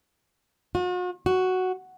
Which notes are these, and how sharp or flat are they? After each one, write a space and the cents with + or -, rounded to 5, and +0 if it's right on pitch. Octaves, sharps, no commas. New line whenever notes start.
F#4 -45
F#4 +0